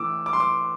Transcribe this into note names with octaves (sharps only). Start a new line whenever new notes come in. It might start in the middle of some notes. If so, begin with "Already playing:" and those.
Already playing: A2 E3 D6 E6
D6
C6
D6